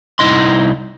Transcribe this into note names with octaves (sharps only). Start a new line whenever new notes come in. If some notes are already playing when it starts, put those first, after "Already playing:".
C2 D#3 D#4 E4 D#5 C6